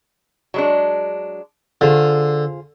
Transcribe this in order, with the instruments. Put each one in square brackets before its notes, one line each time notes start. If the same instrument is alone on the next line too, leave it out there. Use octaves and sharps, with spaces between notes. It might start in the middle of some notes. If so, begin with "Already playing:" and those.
[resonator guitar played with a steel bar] F#3 G#3 D4
[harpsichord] D3 [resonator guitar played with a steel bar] F4 G#4 C5